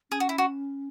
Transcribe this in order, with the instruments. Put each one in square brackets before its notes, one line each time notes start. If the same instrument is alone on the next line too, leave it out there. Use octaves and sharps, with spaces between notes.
[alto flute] C#4 [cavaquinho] G#4
[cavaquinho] F#4
E4
F#4